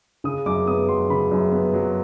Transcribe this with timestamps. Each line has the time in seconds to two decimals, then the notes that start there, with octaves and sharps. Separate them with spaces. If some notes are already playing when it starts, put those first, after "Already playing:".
0.24 C#3 D#6
0.46 F#2 D6
0.67 B3 D#6
0.88 F#3 C6
1.10 C#3 B5
1.31 F#2
1.52 B3
1.74 F#3